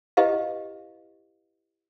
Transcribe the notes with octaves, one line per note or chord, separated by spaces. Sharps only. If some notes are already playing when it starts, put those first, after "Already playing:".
E4 G4 B4 D#5 F5